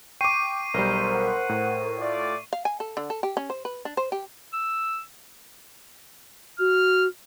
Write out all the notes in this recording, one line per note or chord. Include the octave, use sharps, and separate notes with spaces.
G5 C#6 D6 C7 D#7
B1 G3 A#4 C5
F#5
A2
A3 F4 D5
F5
G#5
A4
D3
A4
G4
C#4
C5
B4
D4
C5
G4
E6
F#4 F6